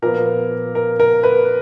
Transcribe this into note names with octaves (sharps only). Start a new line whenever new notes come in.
A#2 F3 B3 A#4
A#4
A#4
B4